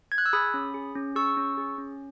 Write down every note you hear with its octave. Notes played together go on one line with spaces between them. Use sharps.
G#6
F#6
E6
G#4 B5 D#6
C#4
G#4
C#4
G#4 C#6 E6
C#4
G#4
C#4